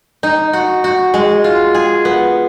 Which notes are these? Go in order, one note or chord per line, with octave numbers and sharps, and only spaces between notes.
D#4
F#4
F#4
G#3
F4
G#4
B3